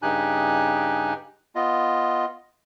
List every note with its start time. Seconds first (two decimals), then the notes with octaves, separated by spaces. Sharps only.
0.02 G2 C#3 D#4 G4 G#5 F#6
1.55 B3 F4 D#5